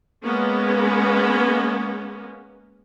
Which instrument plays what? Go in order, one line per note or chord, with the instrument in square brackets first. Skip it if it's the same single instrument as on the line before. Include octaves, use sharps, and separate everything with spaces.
[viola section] G#3 A#3 B3 C#4